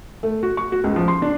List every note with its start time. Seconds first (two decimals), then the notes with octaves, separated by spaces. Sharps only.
0.23 A3
0.43 F#4
0.57 C#6
0.72 F#4
0.84 C#2
0.96 F3
1.08 C6
1.22 D4